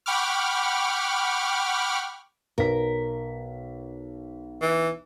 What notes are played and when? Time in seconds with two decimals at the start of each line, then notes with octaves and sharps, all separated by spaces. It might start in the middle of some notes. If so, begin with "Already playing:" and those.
0.06 F#5 G5 B5 C#6 D6 F6
2.58 B1 A#4 B4 B6
4.61 E3